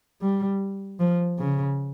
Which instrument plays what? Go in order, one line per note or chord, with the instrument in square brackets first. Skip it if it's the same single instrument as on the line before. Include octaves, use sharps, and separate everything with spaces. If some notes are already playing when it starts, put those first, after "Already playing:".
[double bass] G3
F3
C#3